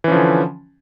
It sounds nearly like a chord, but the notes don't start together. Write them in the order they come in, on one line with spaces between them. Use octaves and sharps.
E3 C#4 F3 D3